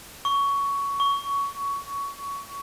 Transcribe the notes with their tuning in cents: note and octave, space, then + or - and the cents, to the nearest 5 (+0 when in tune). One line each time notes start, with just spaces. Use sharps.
C#6 +15
C#6 +20